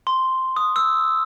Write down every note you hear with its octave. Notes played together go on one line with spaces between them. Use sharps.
C6
D#6
E6